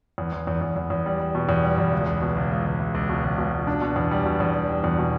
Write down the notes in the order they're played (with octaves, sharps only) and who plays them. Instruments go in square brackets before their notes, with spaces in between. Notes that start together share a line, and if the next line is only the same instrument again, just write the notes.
[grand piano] E2
E2
E2
E2
E2
E2
G3
G3
B2
E2
G3
E2
C#2
C#2
B2
C#2
C#2
C#2
C#2
C#2
B2
C#2
B2
C#2
D4
B2
E2
G3
B2
E2
G3
G3
E2
B2